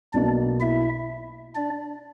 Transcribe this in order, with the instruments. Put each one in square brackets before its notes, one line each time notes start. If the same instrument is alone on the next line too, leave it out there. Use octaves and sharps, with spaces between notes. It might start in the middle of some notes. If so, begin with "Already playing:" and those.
[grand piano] B1 B2 A#3 [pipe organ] D4 D5
[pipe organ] E4 E5
D4 D5